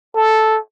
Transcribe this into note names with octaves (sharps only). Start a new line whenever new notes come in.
A4